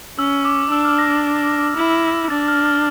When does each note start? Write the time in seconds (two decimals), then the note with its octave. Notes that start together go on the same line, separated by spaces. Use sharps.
0.18 C#4 E6
0.45 D6
0.71 D4 E6
0.85 F6
0.99 A#6
1.12 A6
1.77 E4
2.30 D4 A6
2.48 F6
2.65 F6